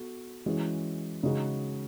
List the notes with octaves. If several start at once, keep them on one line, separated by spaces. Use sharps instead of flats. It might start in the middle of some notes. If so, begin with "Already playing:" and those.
Already playing: B3 F#4 A4
E3 G#3 C#4 F#4
C#3 G#3 D#4 F#4